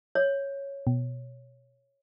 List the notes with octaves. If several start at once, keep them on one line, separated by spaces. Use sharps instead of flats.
C#5
B2